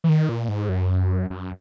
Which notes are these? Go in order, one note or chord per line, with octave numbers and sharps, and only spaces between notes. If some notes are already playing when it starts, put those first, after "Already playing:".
E3
D#3
A#2
G#2
F#2
F#2